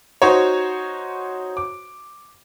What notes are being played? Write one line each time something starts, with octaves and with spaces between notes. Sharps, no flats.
D#4 F#4 C5 C#5
D6